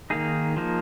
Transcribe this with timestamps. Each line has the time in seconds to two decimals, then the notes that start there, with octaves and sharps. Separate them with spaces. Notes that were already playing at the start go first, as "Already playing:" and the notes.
0.10 D#3 A#3 D#4 G#4
0.57 F3 A#3 D#4